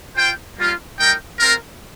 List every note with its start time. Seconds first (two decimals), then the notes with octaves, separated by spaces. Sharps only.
0.16 F4 C5 G5
0.57 G3 A#3 F4
0.99 G3 D#4 A#4 G5
1.39 C4 F4 A#4